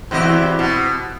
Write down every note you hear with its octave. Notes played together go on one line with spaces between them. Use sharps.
E2 C4 E4 F#4 G4 D#5
B2